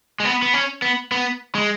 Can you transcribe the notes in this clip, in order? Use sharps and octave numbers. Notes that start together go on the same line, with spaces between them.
G#3
B3
B3
C#4
B3
B3
G#3